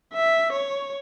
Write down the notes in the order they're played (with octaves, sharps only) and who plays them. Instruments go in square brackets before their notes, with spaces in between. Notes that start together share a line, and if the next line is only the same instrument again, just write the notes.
[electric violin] E5
C#5